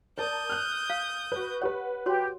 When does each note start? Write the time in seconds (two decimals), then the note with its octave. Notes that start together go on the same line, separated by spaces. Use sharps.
0.18 A#4 D5 A5 D#6 G6
0.50 F6 F#6
0.90 F5
1.32 F#4 B4
1.62 G4 B4 C#5 F#5
2.06 F#4 G4 C#5 C6